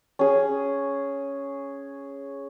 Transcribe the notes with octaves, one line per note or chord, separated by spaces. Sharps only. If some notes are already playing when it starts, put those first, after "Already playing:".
C#4 G#4